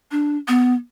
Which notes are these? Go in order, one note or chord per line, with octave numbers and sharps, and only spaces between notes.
D4
B3